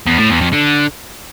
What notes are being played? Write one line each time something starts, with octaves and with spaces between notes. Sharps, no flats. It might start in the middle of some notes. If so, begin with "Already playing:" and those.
E2
A2
E2
F2
D3